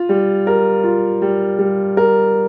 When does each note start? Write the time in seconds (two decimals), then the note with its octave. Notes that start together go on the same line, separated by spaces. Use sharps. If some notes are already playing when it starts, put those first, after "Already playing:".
Already playing: F4
0.09 G3
0.47 A#4
0.84 F4
1.22 G3
1.59 G3
1.97 A#4